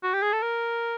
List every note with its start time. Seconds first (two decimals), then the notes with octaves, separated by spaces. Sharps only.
0.03 F#4
0.14 G4
0.23 G#4
0.33 A4
0.42 A#4